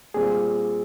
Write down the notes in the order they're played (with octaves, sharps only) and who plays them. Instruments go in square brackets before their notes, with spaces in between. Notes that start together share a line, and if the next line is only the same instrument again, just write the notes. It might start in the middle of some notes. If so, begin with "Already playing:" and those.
[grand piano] A#2 G3 C4 F4 [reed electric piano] G#4